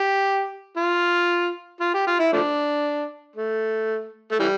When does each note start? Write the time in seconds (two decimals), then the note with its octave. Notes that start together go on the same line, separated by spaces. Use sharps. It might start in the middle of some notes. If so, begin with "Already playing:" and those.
Already playing: G4
0.77 F4
1.80 F4
1.94 G4
2.07 F4
2.19 E4
2.33 F3 A3 D4
3.36 A3
4.32 A3
4.40 E3 G3